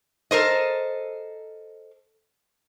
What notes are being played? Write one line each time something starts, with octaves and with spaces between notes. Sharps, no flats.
A4 A#4 C5 D#5